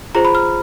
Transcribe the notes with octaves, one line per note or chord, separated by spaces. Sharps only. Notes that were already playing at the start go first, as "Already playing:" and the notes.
F4 G#4 C5 A#5
B5
F6